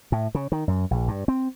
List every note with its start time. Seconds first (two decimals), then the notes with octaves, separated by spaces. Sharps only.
0.12 A2
0.35 C#3
0.52 D#3
0.68 F#2
0.91 A#1
1.08 G2
1.28 C4